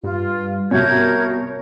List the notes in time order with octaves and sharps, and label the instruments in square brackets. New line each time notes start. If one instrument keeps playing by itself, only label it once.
[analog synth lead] G2 [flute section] F4
[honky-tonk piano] C2 B2 [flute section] A#4 G6 G#6 [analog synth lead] C#5